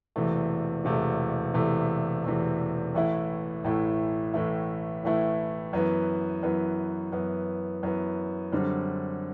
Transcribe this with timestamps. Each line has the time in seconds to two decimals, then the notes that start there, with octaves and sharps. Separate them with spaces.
0.16 E1 E2 C3 E3 A3
0.85 E1 E2 C3 E3 A3
1.54 E1 E2 C3 E3 A3
2.24 E1 E2 C3 E3 A3
2.94 A1 A2 E3 A3 E4
3.64 A1 A2 E3 A3 E4
4.34 A1 A2 E3 A3 E4
5.03 A1 A2 E3 A3 E4
5.73 F#2 E3 B3
6.43 F#2 E3 B3
7.12 F#2 E3 B3
7.83 F#2 E3 B3
8.52 F#2 D3 G3 C4